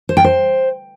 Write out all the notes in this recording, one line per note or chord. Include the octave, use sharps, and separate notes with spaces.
C5
G5
C5